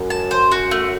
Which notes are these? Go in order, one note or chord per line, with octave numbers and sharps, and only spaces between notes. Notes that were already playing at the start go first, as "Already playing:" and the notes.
Already playing: F#2
A5
C5
F#4
A3